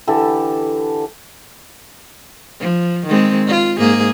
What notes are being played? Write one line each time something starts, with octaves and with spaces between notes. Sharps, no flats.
D3 E3 G4 A4
F3
D#3 G#3 C4
F4
G#2 A#3 G#4